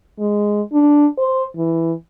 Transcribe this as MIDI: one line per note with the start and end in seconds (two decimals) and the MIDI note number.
0.19 0.62 56
0.73 1.07 62
1.18 1.44 72
1.57 1.93 52